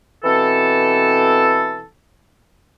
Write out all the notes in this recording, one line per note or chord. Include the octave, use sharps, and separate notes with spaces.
B2 E3 C4 A4